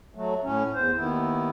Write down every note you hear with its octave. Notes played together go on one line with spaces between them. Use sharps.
F#3 A3
A2 C#4
E2 C5
D#2 D#3 B3 E4